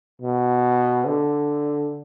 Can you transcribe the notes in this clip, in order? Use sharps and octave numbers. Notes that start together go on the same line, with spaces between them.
B2
D3